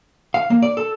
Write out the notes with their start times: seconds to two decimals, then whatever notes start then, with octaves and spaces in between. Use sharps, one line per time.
0.34 F5
0.50 A#3
0.63 D5
0.77 A4